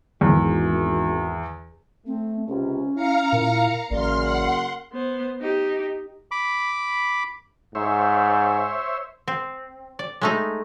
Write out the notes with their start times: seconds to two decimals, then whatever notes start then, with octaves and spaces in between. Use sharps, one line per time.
0.21 G#1 E2
2.06 A3 C4
2.48 C#2 C3 C#4
2.95 E4 F5 A#5 C#7
3.32 A#2 E4 A#4
3.90 A1 F#2 C#3 A#3 D5 C6 F6
4.21 F#5 C6
4.92 B3 C5
5.41 D#4 G4
6.31 B5 D6
7.75 G#2 C5 C#5 E5
9.28 C4
9.99 D5
10.21 G#3 A3 D#4